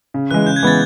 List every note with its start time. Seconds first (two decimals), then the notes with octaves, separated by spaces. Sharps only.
0.14 C#3
0.31 E3 G#3 F#6
0.47 C#3 G6
0.56 G#6
0.63 E3 G#3 B3 A6